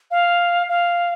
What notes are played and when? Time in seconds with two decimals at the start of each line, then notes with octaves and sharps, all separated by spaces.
0.11 F5
0.69 F5